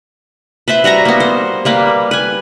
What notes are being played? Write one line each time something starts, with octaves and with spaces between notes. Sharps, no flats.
B4 C5 E5 C6
G3 F#4 E5 A#5
A#3 B3
C5
G3 A#3 B4
B4 G#5